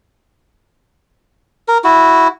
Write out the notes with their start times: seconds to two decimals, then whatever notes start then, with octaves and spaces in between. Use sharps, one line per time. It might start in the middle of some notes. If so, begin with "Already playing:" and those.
1.68 A#4
1.84 E4 F#4